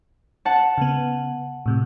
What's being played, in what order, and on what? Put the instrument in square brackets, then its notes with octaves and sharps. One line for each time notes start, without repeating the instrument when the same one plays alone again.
[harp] F#5 A5
[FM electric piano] C#3 B3
A2 C3